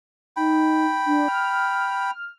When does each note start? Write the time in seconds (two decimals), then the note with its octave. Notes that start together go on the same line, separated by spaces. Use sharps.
0.36 D#4 G5 B5
1.06 D4
1.28 F6